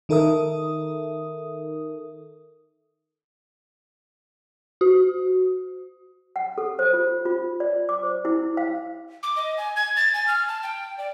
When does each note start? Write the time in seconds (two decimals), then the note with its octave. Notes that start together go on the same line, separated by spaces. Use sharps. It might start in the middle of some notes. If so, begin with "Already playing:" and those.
0.09 D#3 D#4 A4 A#4 E5 D#6
4.81 F#4
6.36 F#5
6.58 A4
6.79 C5
6.93 F4
7.25 F4
7.60 D5
7.89 D6
8.03 C5
8.25 E4
8.57 F5
9.23 D6
9.36 D#5
9.58 G#5
9.76 G#6
9.96 A6
10.14 G#5
10.28 F6
10.48 A5
10.63 G5
10.98 D5